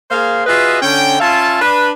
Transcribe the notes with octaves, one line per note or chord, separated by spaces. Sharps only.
A#3 G#4 C5 F5
F4 F#4 G#4 B4 D#5 E5
D3 C#4 G5
C#4 F4 E5 F5 A5
D4 B4 B5